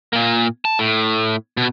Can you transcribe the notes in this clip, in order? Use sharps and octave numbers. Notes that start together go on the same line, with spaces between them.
A#2 A#3
A5
A2
B2